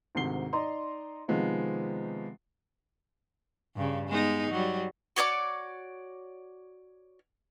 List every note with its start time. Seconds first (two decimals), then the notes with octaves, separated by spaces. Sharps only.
0.15 D2 G#2 C3 D#3 C7 G7
0.53 D#4 D5 D#5 A#5 C6
1.28 C3 D#3 F3 G#3 B3 C4
3.76 G2 C#3
4.08 G#3 B3 D#4
4.51 F#3 G3
5.16 F#4 C#5 D5 D6